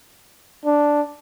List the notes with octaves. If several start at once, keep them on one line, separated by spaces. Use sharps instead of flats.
D4